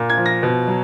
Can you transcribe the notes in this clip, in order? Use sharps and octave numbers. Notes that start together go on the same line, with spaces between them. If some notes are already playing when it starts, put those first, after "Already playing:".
Already playing: A#2
G#6
F3
A#6
B2
F#3